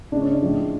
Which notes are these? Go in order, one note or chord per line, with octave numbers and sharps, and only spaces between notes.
C#3 G#3 D4
C#4
D4
A2 F3 G#3